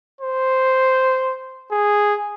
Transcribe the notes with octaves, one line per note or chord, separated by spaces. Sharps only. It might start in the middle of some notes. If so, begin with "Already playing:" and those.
C5
G#4